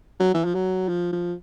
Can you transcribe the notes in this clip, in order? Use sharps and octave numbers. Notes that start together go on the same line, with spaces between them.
F#3
E3
F3
F#3
F3
F3